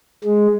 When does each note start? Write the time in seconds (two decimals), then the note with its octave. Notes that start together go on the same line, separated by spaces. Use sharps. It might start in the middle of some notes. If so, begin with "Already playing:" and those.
0.24 G#3